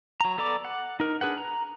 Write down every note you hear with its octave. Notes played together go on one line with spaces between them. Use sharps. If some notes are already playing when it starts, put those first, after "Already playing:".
F#3 A#5
B3 A4 D5 A#5 D6
F#5
D#4 A#4
D4 G#4 B4 F#5
A#5